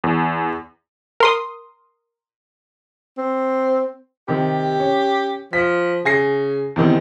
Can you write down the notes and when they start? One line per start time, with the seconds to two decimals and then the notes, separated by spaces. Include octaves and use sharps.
0.04 E2
1.20 A#4 C6 D#6
3.18 C4
4.28 C3 D#3 G4
4.80 C#4
5.53 F3 B6
6.05 C#3 G#5 A#6 C7
6.76 E2 C3 D#3